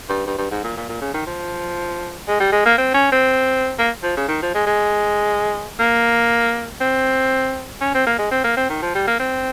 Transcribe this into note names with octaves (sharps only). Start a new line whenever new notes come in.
G2
G2
G2
G#2
A#2
A#2
A#2
C#3
D#3
F3
G#3
G3
G#3
A#3
C4
C#4
C4
A#3
F3
C#3
D#3
F3
G#3
G#3
A#3
C4
C#4
C4
A#3
G#3
C4
A#3
C4
D#3
F3
G3
A#3
C4